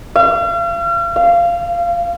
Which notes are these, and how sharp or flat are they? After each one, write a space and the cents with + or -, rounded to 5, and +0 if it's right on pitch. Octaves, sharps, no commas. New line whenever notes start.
F5 -40
F5 -15